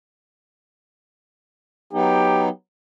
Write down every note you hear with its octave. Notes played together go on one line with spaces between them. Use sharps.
F#3 B3 D#4 G4